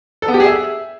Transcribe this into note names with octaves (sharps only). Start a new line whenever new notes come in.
A4
B3
G4
G#4
E5